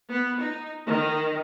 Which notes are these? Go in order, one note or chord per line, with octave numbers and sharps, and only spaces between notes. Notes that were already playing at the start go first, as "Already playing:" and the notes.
B3
D#4
D#3